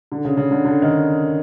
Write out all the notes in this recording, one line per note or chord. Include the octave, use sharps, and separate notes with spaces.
D3
C#3
C#3
D3
D3
D#3